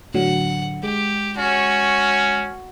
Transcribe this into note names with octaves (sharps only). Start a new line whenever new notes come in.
A2 D3 F#3 F#5
G#3 G4
C#4 F#4